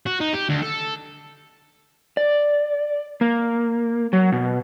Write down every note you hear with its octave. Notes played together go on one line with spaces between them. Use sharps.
F#4
D#4
G4
D2
A4
D5
A#3
F#3
B2